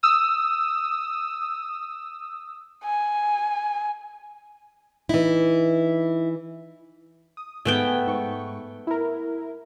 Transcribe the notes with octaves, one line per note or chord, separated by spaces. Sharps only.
D#6 E6
G#5
E3 D#4 E4
D#6
G#2 A3 B3 G5 G#5
G#2 C#6
E4 A#4